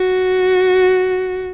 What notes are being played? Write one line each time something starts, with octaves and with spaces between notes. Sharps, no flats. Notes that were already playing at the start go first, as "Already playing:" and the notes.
Already playing: F#4